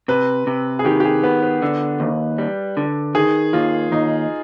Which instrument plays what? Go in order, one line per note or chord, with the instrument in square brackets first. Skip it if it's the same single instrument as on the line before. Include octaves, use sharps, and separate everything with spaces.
[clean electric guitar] C3 [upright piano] B4
[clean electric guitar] C3
[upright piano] G#4
[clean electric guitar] D#3 [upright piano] G4
[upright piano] G4
G#4
[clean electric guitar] B3 [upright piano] B4
[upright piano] B4
[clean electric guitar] D3
D#2
G3
D3
[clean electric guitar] D#3 [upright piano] G#4
[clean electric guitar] D#2 [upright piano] F4
[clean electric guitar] D#2 [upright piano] D#4